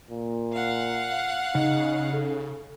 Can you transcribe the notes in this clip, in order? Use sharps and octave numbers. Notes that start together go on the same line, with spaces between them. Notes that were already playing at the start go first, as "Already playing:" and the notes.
A#2
F5 F#5
C#3 D#4
A4